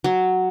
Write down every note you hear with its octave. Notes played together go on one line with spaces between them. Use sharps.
F#3